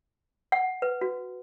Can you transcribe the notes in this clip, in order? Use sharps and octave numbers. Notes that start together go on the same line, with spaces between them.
F#5
B4
F#4